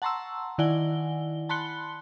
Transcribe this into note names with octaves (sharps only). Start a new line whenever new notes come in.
F#5 A5 A#5 C6 C#6 E6
D#3 E4 D5 F#5 G#5 G7
A5 B5 C6 F#6 C#7 G7